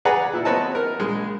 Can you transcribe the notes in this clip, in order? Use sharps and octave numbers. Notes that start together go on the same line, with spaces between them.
G#4 B4 D5 F#5 G#5 A#5
A#2 E4
B3 C4 B4 C#5 D#5 A5
A#4
A#1 G#3